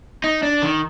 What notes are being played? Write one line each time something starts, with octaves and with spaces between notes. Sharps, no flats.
D#4
D4
D#3